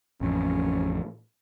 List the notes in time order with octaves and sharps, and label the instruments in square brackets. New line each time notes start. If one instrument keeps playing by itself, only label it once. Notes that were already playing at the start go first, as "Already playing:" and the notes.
[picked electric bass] A1 F2 [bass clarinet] C#4